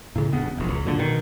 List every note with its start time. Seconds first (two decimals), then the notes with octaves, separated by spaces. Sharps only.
0.16 A2 C#3
0.32 D#1 G2 B3
0.57 E1 A#1
0.70 C#2
0.85 F#2 A#2 D3
0.99 B2 D#3